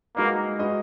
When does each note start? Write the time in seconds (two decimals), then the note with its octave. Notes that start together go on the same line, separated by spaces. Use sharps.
0.16 G#3 A#3 D#4 F#4 B4 D#5
0.59 G#3 D#4 F#4 B4 D#5